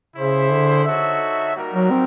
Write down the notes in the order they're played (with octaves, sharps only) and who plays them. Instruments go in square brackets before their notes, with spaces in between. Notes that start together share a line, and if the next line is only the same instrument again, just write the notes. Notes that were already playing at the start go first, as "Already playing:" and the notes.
[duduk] C#3 [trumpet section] E4 G#4 C5 E5
[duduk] D3
[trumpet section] D#4 F#4 A4 C#5 E5
G3 A#3 D#4 F#4 A#4
[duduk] F#3
C4